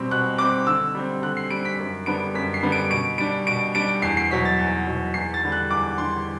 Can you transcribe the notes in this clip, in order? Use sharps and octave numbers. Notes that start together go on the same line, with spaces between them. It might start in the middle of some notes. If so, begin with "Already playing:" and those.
Already playing: B2 G3 C4
B2 F#6
G3 C4 D6
D3 E6
G3 C4
D3 F#6
C7
G3 C4 D7
B6
F#2
D3 G3 B3 D4 D7
F#2 B6
C7
D3 G3 B3 D4
D7
B2 D7
G3 D4 D7
B2 D7
G3 D4 D7
E2 C7
C7
B2 F#3 B6
A6
E2
B2 F#3
E2 C7
A6
D3 G3
F#6
E2 D6
D3 G3 C6